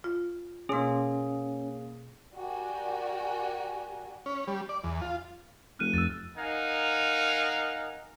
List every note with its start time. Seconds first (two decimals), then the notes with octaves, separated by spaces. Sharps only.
0.04 F4
0.69 B2 A#3 C#4 G#4 C6
2.34 F#4 G4 A#4 D5 G5 G#5
4.26 C#4
4.47 G3
4.69 D5
4.84 E2
5.01 F4
5.79 F1 F6 F#6 D#7
5.94 F2 E6 A6
6.37 D#4 A#4 F5 F#5 G#5